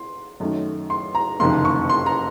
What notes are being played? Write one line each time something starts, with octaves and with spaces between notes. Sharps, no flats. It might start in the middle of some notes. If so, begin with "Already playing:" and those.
Already playing: C6
F#2 D#3 A3 C#4
C6
A#5
F#1 F2 C3 D#3 A#3 C6
C#6
C6
A#5